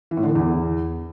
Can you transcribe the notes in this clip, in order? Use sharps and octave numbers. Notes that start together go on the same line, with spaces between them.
E3
A2
D3
E3
E2